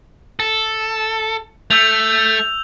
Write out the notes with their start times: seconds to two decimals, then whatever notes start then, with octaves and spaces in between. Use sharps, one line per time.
0.40 A4
1.71 A3 E6 G6 F7